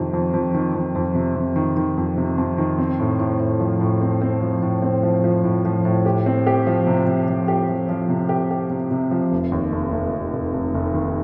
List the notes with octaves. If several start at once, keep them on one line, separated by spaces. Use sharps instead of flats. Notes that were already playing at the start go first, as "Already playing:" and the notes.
Already playing: F2 C3 D#3
F2
F2
D#3
F2
F2
C3
F2
D#3
D#3
F2
C3
F2
D#3
C4
A2
A2
A2
F3
A2
C4
C4
F3
A2
C4
F3
F3
A2
F3
A2
G4
C4
G4
F3
C3
C3
F3
G4
F3
F3
C3
G4
G4
C3
C3
F3
F1
D#2
F1
F1
F1
F1
F1
F1
D#3